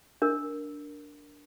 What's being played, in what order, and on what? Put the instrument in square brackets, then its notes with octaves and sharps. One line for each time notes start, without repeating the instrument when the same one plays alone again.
[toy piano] D4 A#4